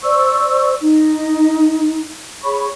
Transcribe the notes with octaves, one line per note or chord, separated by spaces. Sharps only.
C5 D5 C#6 E6
D#4
G#4 C#5 B5 C#6